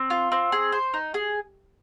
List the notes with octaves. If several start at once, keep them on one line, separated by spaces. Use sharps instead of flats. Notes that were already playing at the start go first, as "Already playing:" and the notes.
Already playing: C4
F4
C4
G#4
C5
D#4
G#4